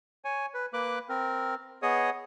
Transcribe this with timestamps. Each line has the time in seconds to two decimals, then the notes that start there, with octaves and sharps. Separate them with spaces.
0.25 C#5 G#5
0.54 B4
0.73 A#3 B4 D6 F#6
1.09 C4 A#4
1.82 B3 G#4 C#5 D#5 D#6